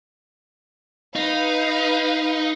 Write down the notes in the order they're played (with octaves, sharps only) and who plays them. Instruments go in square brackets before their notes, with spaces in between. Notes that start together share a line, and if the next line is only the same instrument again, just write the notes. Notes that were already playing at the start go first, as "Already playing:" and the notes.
[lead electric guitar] D#4 [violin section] B4 F5